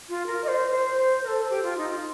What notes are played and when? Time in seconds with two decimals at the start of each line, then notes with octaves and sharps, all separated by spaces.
0.09 F4
0.26 A#4
0.44 D#5
0.48 C5
0.71 C5
0.96 C5
1.23 A#4
1.27 A4
1.49 G4
1.63 F4
1.77 D#4
1.89 F4